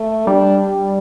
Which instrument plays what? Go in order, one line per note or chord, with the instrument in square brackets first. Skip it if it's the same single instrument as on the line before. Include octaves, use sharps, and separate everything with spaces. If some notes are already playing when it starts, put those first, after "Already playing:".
Already playing: [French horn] A3
[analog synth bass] G3 [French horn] D4